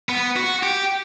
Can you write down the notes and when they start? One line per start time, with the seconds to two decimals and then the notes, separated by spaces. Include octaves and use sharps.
0.09 B3
0.36 F#4
0.63 G4